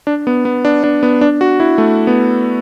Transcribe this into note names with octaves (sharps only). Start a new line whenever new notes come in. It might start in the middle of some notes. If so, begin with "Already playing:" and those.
D4
B3
B3
D4
D4
B3
D4
F#4
E4
A3
B3